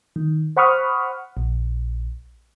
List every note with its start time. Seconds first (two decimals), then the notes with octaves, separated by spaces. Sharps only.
0.16 D#3
0.57 C5 F#5 B5 C#6 D#6 F6
1.37 A#1